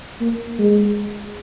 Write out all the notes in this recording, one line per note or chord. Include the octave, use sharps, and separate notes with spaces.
A#3
G#3